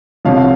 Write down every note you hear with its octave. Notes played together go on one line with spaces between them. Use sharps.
C2 C3 F3 C#5 F5